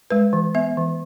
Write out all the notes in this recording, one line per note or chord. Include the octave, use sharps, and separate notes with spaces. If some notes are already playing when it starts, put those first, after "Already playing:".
G#3 B4
E3
B3 E5
E3